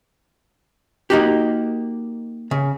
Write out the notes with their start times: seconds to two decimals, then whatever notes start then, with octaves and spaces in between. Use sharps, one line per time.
1.10 A#3 D#4 F#4 G4
2.51 C#3